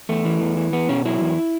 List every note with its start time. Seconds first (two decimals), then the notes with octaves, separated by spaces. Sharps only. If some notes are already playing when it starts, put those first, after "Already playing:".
0.09 E2 A3
0.25 E3
0.41 E2
0.57 E3
0.73 E2 B3
0.89 B2 C#4
1.05 F#3 E4
1.21 E2